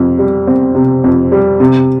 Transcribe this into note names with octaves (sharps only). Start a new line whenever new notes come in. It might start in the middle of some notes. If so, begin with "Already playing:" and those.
Already playing: F2 C3
G3
C4
C3
F2
G3
C3